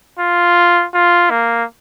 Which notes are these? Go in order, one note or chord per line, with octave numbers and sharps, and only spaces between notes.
F4
F4
A#3